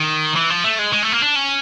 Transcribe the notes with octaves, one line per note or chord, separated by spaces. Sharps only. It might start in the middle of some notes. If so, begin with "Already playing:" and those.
Already playing: D#3
E3
F3
A3
G#3
G#3
A3
A#3
D4
C#4